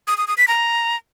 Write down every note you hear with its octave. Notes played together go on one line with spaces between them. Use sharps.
D#6
D#6
D#6
B6
A#5